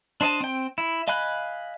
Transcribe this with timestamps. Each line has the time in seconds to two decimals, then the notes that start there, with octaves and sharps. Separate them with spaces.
0.21 D4 C5 D#5 A5
0.41 C4 G5
0.78 E4
1.08 D#5 F5 G#5 B5 F#6